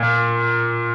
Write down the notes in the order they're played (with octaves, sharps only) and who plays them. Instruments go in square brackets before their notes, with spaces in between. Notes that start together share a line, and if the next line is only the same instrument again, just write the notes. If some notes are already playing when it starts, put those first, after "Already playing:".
Already playing: [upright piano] A#2